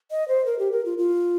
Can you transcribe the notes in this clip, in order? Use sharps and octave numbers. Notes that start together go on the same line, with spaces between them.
D#5
C5
A#4
G4
A#4
F4
F4